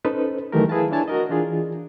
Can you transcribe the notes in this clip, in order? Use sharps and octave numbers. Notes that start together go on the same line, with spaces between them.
C#4 D#4 A4 B4 C5
D#3 E3 F#3 A3 G4 A#4
E4 G#4 B4 F5 A5
D4 E4 C#5 G#5 A5
F#4 A#4 D#5
E3 D4 F4 G#4